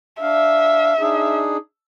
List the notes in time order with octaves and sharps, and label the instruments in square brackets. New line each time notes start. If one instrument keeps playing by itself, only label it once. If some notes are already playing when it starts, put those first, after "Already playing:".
[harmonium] D4 F5 [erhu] E5
[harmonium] D4 D#4 G#4